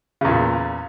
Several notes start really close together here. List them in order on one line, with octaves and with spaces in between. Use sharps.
C#3 E2 A#2